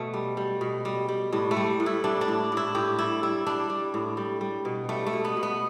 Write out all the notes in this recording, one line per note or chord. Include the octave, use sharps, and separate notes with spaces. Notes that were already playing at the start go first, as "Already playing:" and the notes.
Already playing: B2 A3
G3
G3
B2
G3
G3
A2 G3
A3
G3
A2
E4
G3 D4
D4
A2
A2 E4
A2 G4
G3 E4
G3 E4
G3 D4
G3
A2
G3
G3
B2
G3 A3
A3
B2
B3
B2
B3